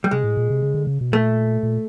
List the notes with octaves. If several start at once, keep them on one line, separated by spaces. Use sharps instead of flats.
G3
C3 G#3
A2
A#2
C3
C#3
D3
C#3
B2
A#2 A3
A#2